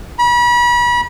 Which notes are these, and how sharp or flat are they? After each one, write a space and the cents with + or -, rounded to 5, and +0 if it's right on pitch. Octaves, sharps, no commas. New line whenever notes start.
B5 -35